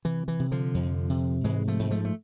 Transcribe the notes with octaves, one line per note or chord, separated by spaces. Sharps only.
C3 E3
E3
C3
D3 F3
F2
C3
G#2 E3 G#3
F3 A3
G#2
F3 A3
A3